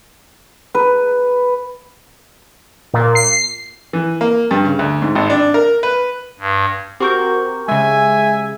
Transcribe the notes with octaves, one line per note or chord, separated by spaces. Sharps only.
B4
A#2
C7
E3
A#3
G2
C#3
D2
G#2
G#1
D4
A#4
B4
G2
C4 F#4 G4 A#4 C#6 G6
C#3 G#3 E5 G#5